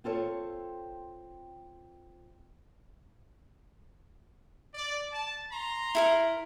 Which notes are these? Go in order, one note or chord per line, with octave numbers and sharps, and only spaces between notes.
C4 F4 A4 C#5
D5
A5
A#5 C6
E4 A4 A#4